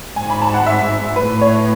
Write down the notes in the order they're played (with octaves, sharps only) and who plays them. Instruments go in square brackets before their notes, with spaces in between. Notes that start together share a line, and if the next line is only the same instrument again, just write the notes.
[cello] G#2 [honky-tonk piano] G#5
[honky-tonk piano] B5
A5
F#5
E5
[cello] A2 [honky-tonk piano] B4
[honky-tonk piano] C#5